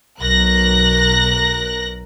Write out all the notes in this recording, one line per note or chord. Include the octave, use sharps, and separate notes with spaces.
B1 A#4 F#6 A#6